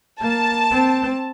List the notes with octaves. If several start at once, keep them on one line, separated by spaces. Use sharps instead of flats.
A#3 A5
C4